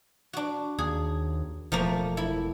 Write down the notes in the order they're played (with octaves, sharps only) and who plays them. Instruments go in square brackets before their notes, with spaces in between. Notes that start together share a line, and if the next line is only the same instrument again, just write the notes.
[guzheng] D4 F#4
[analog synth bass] D#2 [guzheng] G#4
[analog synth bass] E1 [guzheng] F3 A3 A#3
[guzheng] E4